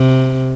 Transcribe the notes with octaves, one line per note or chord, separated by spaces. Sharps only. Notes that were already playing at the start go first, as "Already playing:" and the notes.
Already playing: C3